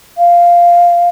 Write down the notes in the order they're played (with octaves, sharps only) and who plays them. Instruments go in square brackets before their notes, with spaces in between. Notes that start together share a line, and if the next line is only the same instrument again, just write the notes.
[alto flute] F5